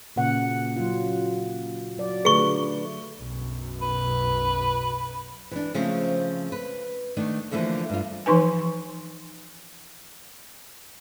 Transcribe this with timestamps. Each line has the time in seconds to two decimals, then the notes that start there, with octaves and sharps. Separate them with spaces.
0.16 A#2 C#3 F#5
0.76 F#3 F4
1.98 F#3 D5
2.25 D3 A3 G#4 B4 C#6
3.18 B1 F#2
3.81 B4
5.51 E3 D4
5.74 C#3 F3 A3 C4 C#4
6.52 B4
7.17 D#3 A3 D4
7.51 D3 E3 F3 A3 A#3
7.89 G2 F4
8.26 E3 F3 D#4 B4 G#5